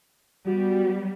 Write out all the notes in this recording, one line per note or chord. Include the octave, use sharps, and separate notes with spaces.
G3 B3 F#4